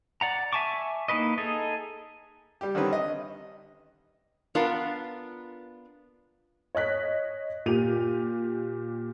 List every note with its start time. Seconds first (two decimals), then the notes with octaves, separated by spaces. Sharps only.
0.21 D5 F#5 A#5
0.53 E5 G#5 A5 C#6 D6
1.08 A#3 D#4 E4 B4 D#5
1.38 D#4 G#4 A4 D#5
2.61 G3 G4
2.75 D3 D#3 G3 C4 C#4 B4
2.93 D#5
4.55 B3 D4 F4 A#4
6.75 C#5 D#5 F#6 B6
7.66 A#2 G4 D#7 F7